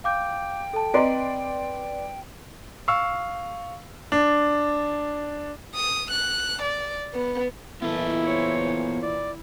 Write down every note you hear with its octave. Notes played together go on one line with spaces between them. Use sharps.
F5 G5 D6 G6
A4 A5
C4 B4 D5 D#5 A#5 C6 D7
F5 C#6 E6
D4
D#6
F#6
D5
B3
A#2 E3 B3 E4 A4
C5 C#5
E4 D5